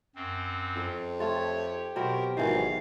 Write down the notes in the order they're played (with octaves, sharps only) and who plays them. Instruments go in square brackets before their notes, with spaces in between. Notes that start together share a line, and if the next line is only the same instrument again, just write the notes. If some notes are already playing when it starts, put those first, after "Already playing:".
[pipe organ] F#2 C4
[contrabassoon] F2
[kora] A3 F4 [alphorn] G4 [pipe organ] C#5
[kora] B2 F#3 C4 [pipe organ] A#4
[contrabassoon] G#1 [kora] D#3 E3 F#3 [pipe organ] F5